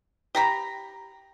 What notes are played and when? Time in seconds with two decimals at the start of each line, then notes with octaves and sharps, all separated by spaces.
0.35 G4 A#5 B5